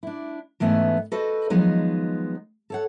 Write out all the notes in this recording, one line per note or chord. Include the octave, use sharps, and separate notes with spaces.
D4 E4
G#2 E3 A3 B3 C#4
F#4 A4 B4 C5 D#5
D#3 F3 F#3 G#3 B3 D#4
A4 C#5 F#5